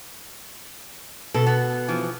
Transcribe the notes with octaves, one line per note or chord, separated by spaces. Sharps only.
B2 A4
B3
E3 F3